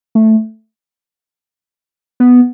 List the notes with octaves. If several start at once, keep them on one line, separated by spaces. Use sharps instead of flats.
A3
B3